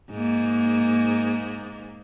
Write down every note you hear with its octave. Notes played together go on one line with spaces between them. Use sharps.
G#2 A#3